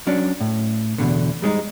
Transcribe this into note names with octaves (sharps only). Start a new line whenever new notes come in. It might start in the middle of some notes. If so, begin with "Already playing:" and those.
F#3 C#4 D4
A2
E2 G#2 B2 D3
G3 G#3 C#4 D#4